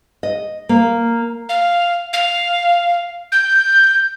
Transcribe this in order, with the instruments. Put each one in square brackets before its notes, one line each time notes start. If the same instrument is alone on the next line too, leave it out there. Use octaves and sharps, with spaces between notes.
[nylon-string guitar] D#5
A#3
[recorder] F5
F5
G6